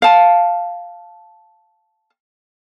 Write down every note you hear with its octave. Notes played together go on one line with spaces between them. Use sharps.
F5 A5